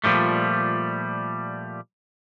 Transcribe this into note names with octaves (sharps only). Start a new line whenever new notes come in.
A#2 D3 F3 G3 A3